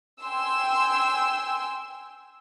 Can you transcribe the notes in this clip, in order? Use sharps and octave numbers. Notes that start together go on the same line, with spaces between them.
G5 G#5 C6 E6